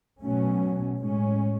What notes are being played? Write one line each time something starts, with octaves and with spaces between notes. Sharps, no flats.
B2 F#3 A3 C#4
A2 G#3 C#4